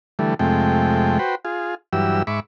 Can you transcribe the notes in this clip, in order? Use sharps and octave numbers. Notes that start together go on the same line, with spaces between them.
D3 E3 G3 A3
F2 C3 G#3 A3 G5
F#4 B4 C5 G5
F4 G#4
G2 E3 F#3 G4 E6
G#2 E5 B5 C#6 D6